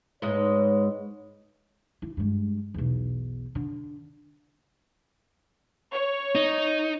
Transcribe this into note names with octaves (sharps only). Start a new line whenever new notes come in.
G#2 G#3 D#4 B4 C#5
E4
G2 G#3
B1 E2
D3
C#5
D#4